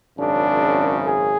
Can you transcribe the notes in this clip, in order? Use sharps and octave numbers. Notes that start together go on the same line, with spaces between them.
G#1 F#2 C#3 D4
G#4